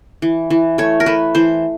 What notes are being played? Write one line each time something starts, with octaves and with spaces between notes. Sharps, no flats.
E3
E3
A3 C#5
A#4
A3 B4
E3 C5